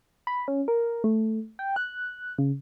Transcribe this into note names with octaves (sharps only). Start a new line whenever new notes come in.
B5
C#4
A#4
A3
G5
F#6
C#3